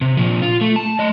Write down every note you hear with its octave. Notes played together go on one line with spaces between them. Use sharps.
C3
A#2 F3
F4
A3
A5
A3 D#5